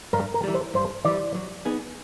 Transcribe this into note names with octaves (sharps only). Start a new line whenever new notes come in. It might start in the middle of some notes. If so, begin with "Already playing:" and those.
G2 A#4
A#4
E3 G3
C5
G2 C5
E3 G3 D5
F#3
B3 D#4 G#4